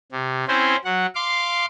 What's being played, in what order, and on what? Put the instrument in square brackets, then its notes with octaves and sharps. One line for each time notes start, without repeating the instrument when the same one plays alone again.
[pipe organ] C3
C4 C#4 E4 C5
F#3 F#5
F5 C6 D6